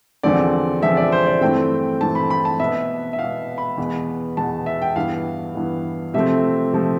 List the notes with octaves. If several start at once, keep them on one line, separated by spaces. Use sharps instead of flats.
E2 D3 F3 C4 D5
E2 D3 F3 C4 E5
D5
C5
D5
G2 E3 A3 C4 G5
G2 E3 A3 C4 A5
B5
B5
A5
B2 B3 E5
E5
B2 B3 F5
B5
E2 B2 B3
E2 B2 B3 A5
E5
G5
G2 E3 B3 F5
G2 E3 B3
C3 F3 A3 C4 E5
C3 F3 A3 C4